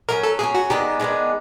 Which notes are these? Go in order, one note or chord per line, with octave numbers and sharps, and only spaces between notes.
F#3 A#3 C#4 A#4
A4
F#3 A#3 C#4 G#4
F#4
D#3 G#3 B3 D4 G4
D#3 G#3 B3 D4